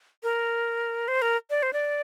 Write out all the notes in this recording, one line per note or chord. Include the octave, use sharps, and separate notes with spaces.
A#4
C5
A#4
D5
C5
D5